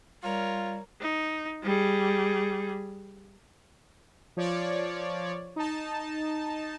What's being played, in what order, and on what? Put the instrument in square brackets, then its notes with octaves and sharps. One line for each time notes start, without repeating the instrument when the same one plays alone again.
[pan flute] G3 [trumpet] F4 [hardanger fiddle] A#4 C#5
[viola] D#4
G3 G#4
[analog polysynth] F3 C#5 D5
D#4 A5